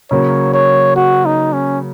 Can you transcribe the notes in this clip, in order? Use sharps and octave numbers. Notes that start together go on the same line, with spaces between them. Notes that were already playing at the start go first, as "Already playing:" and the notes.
C#3 F#3 A#3 C#5
C#5
F#4
D#4
C#4